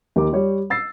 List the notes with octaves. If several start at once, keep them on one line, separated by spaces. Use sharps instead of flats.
D#2 A#4 D6
G3 G4 C#5
E6 A6 C7